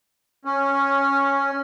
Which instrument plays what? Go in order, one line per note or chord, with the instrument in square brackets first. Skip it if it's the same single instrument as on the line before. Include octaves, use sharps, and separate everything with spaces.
[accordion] C#4